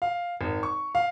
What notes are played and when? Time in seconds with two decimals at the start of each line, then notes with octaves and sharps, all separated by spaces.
0.02 F5
0.41 G#1
0.63 C#6
0.95 F5